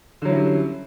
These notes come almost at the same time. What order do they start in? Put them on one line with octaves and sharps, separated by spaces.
D3 F#3 E4 C#4 G3